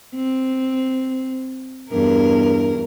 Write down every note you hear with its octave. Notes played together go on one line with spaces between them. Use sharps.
C4
E2 G2 A#4